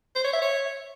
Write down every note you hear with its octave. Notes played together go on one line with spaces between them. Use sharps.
C5
C#5
E5
C#5